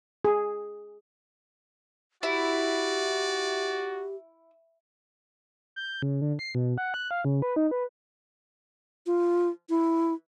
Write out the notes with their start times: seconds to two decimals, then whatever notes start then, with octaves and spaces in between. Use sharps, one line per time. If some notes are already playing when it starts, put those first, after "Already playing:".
0.25 G#4
2.23 E4 F#4 G4 D5
5.76 G6
6.02 C#3
6.21 D3
6.39 C7
6.55 B2
6.78 F#5
6.94 F#6
7.11 F5
7.25 C#3
7.42 B4
7.56 D#4
7.71 B4
9.06 F4
9.69 E4